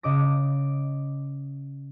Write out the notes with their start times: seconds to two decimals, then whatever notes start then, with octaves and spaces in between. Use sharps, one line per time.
0.03 C#3 D#5 D6 A#6